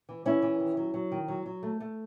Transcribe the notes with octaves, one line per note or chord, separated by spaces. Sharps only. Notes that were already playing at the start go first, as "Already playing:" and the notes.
E3
E3 C#4 E4
E3
D#3
F#3
F#3
D#3
F#3
F#3
A3
A3